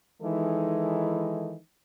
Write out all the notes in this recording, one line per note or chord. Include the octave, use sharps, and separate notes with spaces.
D#3 E3 G#3 D#4 E4 A4